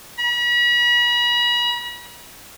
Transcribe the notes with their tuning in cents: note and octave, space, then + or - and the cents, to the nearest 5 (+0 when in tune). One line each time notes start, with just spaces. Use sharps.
B5 -45